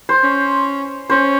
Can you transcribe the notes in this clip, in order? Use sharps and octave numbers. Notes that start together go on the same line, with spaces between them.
C5
C#4
C#4 C5